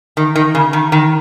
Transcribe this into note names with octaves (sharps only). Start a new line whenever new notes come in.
D#3
D#3
C#3
D#3
D#3